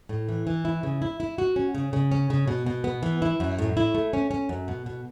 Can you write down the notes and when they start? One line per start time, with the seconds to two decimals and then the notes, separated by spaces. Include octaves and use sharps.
0.09 A2
0.29 E3
0.47 E3
0.65 E4
0.83 C#3
1.02 E4
1.20 E4
1.38 F#4
1.56 C#4
1.75 C#3
1.93 C#3
2.11 C#4
2.30 C#3
2.48 B2
2.66 B2
2.84 B3
3.03 E3
3.22 E4
3.40 F#2
3.59 A2
3.77 E4
3.95 A3
4.13 C#4
4.31 C#4
4.49 F#2
4.68 B2
4.86 B2